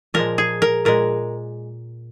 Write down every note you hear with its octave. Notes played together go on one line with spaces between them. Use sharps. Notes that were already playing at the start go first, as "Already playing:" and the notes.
A#2 F3 G#3 A#4
G#4
A#4
A#2 G#3 A#4